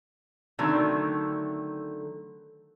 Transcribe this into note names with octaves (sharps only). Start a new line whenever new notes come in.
D3 D#3 F#3 A3 C4